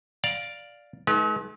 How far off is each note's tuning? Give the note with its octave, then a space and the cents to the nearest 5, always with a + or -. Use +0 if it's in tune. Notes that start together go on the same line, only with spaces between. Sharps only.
D5 +0 F5 +5 A#5 +35
G#3 +45 D#4 +30 B4 -35